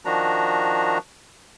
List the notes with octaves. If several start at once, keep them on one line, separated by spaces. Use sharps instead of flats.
D#3 F3 D4 F#4 A#5